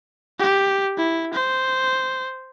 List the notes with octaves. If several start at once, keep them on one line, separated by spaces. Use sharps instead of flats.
G4
E4
C5